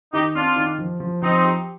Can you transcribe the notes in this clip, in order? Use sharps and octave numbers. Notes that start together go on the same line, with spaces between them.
D#3 D#4 G4
C4 D4 F4
D#3
F3
F3
F3 C4 D#4
G4